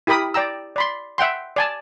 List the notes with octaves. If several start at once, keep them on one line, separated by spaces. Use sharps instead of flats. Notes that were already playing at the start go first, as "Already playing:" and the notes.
E4 G4 A#4 B5 D#6
D5 G5 A#5 E6
D5 B5 C6
E5 F#5 G5 C6
D5 G#5 A5